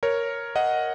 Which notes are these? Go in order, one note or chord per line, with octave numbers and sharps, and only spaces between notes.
A#4 C#5
D#5 F#5